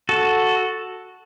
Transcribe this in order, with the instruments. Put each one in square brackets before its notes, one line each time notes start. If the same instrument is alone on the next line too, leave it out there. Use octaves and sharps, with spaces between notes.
[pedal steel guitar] F#4 A4